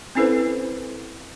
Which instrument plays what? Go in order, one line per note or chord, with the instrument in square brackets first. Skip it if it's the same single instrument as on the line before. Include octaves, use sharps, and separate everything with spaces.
[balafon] C4 C#4 E4 A4 B4 C5